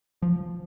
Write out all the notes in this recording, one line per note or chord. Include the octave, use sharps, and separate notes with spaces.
F3